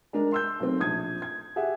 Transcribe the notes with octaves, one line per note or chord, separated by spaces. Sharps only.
G#3 D4 A#4
C6 E6 G6
B1 A3 C4
A#1 D#6 G#6
G#6
G4 G#4 E5 F#5